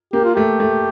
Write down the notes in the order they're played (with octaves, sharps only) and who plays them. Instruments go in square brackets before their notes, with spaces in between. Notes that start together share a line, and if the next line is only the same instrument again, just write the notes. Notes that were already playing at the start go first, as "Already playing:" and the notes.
[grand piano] A#3 [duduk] G4
[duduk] F4
[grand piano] A3 [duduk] G4
[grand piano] A3